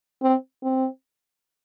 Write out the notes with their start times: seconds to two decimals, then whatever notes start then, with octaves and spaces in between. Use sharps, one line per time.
0.22 C4
0.63 C4